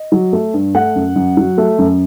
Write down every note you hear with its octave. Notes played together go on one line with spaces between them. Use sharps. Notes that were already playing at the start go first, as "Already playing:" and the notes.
Already playing: D#5
F#3
A3
G2
A3 F#5
F#2
F#2
F#3
A3
F#2